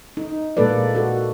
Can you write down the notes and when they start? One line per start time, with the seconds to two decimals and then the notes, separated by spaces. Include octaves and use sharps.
0.17 D#4
0.57 A#2 G#3 A#3 A4 B4 D5
0.95 F#4 A4